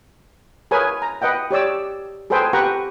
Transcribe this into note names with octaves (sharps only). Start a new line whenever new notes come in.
G#4 A#4 B4 C#5 G#5
A#5
B4 D#5 F#5 G5
G4 C#5 D5 E6
G#4 A4 B4 C5 G5 G#5
G4 B4 F#5 G5 A#5 C#6